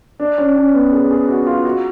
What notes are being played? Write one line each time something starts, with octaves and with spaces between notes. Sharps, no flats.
D4
C#4
C#4
B3
G#4
G#4
F#4
F4
F#4